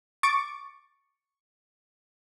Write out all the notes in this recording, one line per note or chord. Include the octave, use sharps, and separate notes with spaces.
C#6 D6 A6 D7